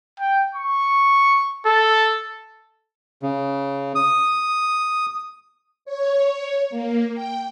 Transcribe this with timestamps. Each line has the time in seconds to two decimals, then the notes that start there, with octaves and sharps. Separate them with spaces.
0.20 G5
0.55 C#6
1.66 A4
3.22 C#3
3.95 D#6
5.85 C#5
6.70 A#3
7.15 G5